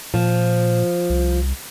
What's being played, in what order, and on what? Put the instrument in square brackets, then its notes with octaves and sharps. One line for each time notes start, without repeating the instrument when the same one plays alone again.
[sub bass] A#2 [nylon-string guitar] F3
[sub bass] C2